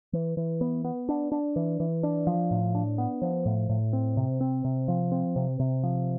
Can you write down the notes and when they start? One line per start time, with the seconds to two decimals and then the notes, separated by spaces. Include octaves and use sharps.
0.13 E3
0.37 E3
0.61 B3
0.84 B3
1.09 D4
1.32 D4
1.56 E3
1.80 E3
2.03 D4
2.27 F3
2.51 A2
2.75 D4
2.98 B3
3.22 F3
3.46 A2
3.69 A2
3.93 C4
4.17 C3
4.41 C4
4.65 C3
4.88 F3
5.12 C4
5.36 C3
5.60 C3
5.83 F3